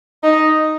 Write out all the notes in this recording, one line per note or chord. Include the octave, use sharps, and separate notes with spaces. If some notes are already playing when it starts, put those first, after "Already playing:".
D#4